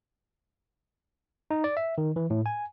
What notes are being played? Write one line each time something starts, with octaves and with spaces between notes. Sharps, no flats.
D#4
D5
E5
D#3
E3
A2
G#5